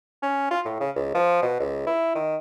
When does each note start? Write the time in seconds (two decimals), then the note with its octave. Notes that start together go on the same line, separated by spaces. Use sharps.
0.23 C#4
0.51 F4
0.65 A2
0.80 C#3
0.96 C#2
1.14 F3
1.42 B2
1.60 C#2
1.87 E4
2.16 D#3